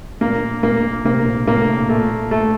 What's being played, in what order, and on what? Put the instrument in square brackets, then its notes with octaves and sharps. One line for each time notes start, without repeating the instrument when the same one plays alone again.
[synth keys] A#2 [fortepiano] A#3
[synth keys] A#2 [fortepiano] A#3
[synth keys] C3 [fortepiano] A#3
[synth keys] A#2
A#2
[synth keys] A2 [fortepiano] A#3
[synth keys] A2
[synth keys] A#2 [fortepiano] A3
[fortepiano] A3